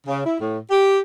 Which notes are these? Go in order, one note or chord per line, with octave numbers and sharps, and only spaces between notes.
C#3
E4
A2
G4